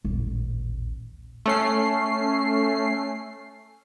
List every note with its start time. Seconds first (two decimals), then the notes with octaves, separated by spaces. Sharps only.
0.05 D#1 A1
1.46 A3 C#4 C7